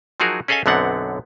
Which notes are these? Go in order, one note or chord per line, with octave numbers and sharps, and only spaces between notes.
F3 F#3 D#4 F#4 G#4 A#4
C#4 G#4 A4 D#5 F5 G#5
B1 F#2 D3 B3 C4 F#5